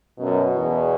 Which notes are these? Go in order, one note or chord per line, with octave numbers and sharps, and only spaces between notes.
F#2 B2
E2